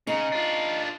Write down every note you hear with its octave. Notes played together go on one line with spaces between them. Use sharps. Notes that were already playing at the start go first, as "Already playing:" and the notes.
C#3 D#4
D4 F4